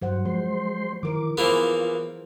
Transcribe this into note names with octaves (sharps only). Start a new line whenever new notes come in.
G2 F#3 C5 F#5
F3 G#3 C5 C6
D#3 E3 A#4 D6
E3 A#3 B3 F4 G#4 C5